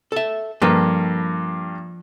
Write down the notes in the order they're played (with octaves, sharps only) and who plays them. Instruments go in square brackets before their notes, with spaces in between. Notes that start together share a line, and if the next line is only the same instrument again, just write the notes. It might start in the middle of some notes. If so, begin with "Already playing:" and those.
[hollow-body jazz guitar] A4 E5
[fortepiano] G2 A#3 [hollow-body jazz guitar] F3 A4 B4